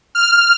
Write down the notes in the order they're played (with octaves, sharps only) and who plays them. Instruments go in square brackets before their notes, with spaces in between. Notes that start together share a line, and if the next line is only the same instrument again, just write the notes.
[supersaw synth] F6